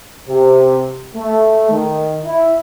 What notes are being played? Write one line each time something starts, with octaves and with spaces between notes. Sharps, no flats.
C3
A3
D#3
E4